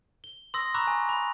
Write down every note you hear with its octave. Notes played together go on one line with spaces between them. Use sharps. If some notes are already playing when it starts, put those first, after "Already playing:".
G7
C6 D#6 E6 A#6
A#5 B5 C#6 D6 E6 F#6
G#5
B5